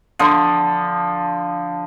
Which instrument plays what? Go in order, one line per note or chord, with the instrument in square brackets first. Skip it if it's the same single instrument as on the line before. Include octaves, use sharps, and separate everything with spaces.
[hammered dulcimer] D3 F3